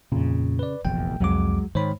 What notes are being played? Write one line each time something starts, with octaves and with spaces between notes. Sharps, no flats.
F2 A#2 C#3
B4 D5
F1 A#1 E2 G5
C2 F2 F#3 G#3 D6
G#2 D#3 C5 C#5 B5